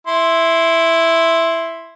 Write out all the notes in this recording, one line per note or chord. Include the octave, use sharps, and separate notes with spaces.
E4 C6